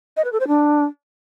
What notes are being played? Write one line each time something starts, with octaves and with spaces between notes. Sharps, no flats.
D#5
B4
A4
C5
D4